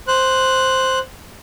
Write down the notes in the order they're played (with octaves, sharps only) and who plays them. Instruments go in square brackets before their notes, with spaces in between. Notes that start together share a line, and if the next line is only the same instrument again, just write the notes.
[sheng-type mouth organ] C5 F#6